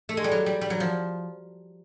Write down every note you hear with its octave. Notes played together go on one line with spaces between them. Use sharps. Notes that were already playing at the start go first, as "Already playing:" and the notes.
A3
G#3
G3
F#3
G3
G3
F#3
F3